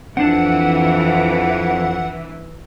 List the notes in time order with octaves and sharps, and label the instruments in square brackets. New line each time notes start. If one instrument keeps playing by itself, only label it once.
[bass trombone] F2 [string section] E3 [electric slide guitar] C4 D4 A5 [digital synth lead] F#5